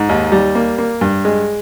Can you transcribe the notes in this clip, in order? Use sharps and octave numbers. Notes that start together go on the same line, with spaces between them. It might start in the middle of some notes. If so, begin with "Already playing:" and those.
Already playing: G#2
D#2
G3
A#3
A#3
G2
G#3